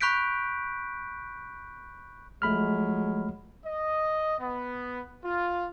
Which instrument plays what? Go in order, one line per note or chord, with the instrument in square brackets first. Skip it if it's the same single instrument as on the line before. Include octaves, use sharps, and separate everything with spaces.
[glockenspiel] B5 C#6 F#6 G6 B6 D7
[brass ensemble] F3 F#3 G#3 [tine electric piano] A3 B5 F6
[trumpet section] D#5
B3
F4